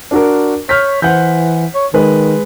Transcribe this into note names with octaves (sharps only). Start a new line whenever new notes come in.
D4 F#4 A#4
C#5 F6 G6 B6
E3 C5 F#5 G6
C#5
D#3 G#3 B4